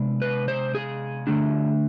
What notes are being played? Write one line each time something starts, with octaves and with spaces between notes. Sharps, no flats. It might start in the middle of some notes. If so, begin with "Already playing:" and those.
Already playing: C3 G#3 B3 D4
B4
C5
G#4
D3 A3 D4